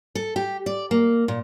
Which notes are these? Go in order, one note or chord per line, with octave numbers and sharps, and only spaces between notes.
A4
G4
D5
A#3
A#2